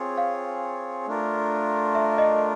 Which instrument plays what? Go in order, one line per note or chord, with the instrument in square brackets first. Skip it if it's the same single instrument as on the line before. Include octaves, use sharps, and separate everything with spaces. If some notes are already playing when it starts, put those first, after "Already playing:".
Already playing: [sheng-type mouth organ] C4 F4 G#4 C#5
[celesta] F5
[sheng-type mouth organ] A3 D4 F4 A#4
[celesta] E5
D#5